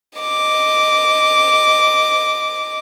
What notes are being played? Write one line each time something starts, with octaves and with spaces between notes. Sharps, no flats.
D#5 D6